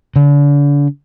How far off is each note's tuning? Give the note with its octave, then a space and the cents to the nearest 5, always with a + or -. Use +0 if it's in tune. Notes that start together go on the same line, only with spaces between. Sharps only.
D3 -40